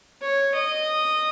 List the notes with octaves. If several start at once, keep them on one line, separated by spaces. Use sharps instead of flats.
C#5
D#5